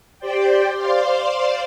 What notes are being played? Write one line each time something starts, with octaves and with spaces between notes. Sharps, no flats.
G4 C5 D5 G5
C5 D5 F5 C6